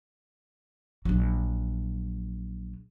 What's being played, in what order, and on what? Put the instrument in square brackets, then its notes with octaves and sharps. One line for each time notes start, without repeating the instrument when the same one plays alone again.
[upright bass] A#1 F#3